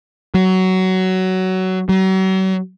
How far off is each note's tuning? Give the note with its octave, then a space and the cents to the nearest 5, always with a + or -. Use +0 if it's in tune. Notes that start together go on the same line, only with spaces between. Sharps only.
F#3 +15
F#3 +40